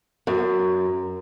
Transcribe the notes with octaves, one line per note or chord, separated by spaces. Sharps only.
F#2